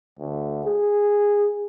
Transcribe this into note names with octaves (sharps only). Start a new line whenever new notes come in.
D2
G#4